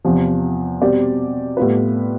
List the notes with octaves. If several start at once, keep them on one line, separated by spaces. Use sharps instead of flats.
E2 C3 F3
B2 G3 C4 G4 D5
A2 G3 B3 F4 B4